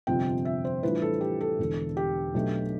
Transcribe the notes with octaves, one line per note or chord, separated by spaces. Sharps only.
G1 F2 C3 F3 C4 G5
E5
C5
A2 E3 G3 D4 F4 B4
A4
G4
A4
E1 E2 D3
G4
B1 B2 A3 D4